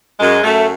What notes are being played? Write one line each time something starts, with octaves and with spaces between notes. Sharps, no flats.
F#2 G#3
F#2 A3